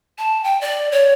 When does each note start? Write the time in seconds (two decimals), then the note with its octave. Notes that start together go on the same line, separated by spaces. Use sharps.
0.18 A5
0.44 G5
0.61 D5
0.92 C#5